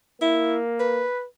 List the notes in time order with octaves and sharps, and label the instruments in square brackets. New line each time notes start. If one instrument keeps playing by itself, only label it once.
[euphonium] A#3 [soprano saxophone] E4
[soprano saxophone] B4